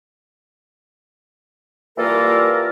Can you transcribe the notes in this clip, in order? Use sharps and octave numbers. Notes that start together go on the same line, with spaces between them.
E3 G3 A#3 F4 A4 A#4